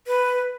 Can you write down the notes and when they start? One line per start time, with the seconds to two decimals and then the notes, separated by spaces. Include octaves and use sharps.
0.07 B4